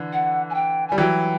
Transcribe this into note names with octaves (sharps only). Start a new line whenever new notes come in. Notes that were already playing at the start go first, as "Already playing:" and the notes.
Already playing: D3 E3
F#5
G#5
G5
G3 G#5
E3 F#3 G5